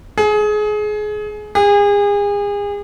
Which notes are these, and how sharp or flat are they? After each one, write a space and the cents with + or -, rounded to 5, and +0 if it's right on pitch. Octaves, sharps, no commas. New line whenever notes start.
G#4 +25
G#4 -35